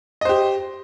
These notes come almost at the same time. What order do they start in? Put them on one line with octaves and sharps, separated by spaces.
D#5 C5 G4